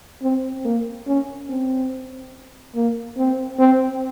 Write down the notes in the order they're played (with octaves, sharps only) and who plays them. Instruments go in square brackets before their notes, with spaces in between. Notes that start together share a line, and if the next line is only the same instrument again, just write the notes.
[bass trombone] C4
A#3
C#4
C4
A#3
C4
C4